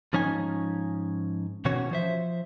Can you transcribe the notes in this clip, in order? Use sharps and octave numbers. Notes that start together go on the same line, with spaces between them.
G#2 F3 C#4 D#4 G#5
B2 D#3 E3 C#4 F#4 C#5
F3 C5 E5